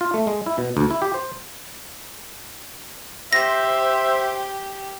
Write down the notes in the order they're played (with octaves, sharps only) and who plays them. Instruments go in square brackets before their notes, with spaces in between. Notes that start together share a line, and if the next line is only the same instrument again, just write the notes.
[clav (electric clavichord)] F4
A3
G#3
E4
B2
D2
E4
G4
C5
[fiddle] G4 [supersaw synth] C5 [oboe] E5 [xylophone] A#6